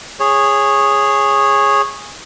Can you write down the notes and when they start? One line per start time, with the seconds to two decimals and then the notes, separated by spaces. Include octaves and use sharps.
0.20 G#4 C#5